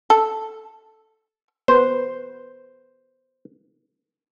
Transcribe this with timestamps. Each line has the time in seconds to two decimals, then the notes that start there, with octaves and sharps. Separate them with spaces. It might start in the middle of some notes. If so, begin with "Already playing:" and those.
0.10 A4
1.68 B3 B4 C5